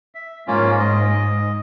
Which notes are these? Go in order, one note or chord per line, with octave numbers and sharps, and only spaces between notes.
E5
G#2 A#3 C#4 F4
D#5